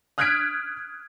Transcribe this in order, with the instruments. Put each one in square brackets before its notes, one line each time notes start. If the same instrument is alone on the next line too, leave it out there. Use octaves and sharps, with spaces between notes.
[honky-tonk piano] D#6 F6 F#6 G#6 B6 D7